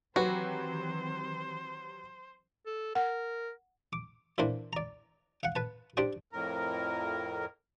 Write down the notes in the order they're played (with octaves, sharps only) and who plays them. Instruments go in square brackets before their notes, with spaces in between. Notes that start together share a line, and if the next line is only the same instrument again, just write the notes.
[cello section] D#3 E3 C4 [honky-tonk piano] F#3 G4 B4 [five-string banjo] F#4 [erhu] C5
[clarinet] A4
[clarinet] A#4 [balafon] F#5
[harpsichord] D6
A#2 E3 A#3 D4 C5 B5
D5 A#5
F5 F#5
B4 A5
D4 G4 C5 D5 G5
[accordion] F2 A2 A#4